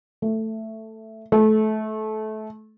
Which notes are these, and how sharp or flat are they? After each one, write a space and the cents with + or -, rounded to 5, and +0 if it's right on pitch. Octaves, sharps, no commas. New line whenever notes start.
A3 +10
A3 -20